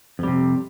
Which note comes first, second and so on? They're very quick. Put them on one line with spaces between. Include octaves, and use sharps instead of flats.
F2 G3 C3